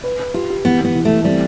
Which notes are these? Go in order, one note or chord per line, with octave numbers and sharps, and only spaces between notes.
B4
B4
F4 G4
G4
E3 B3
E3 B3
E3
E3 A3
G3 C4